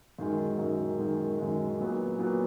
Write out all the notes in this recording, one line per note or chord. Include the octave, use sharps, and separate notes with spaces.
F#2 D#3 G#3
F#2 D#3 G#3
F#2 D#3 G#3
F#2 D#3 G#3
A#2 F#3 B3
A#2 F#3 B3